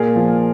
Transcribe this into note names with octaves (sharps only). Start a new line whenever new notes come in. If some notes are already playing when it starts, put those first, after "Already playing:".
Already playing: A#2 G#4 A#4
F3